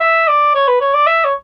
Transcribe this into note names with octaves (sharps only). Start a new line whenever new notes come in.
E5
D5
C#5
B4
C#5
D5
E5
C#5